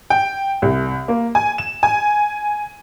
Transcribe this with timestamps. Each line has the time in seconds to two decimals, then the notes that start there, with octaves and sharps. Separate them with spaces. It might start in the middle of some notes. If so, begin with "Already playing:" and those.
0.10 G5
0.62 C2
1.08 A#3
1.35 G#5
1.58 E7
1.83 G#5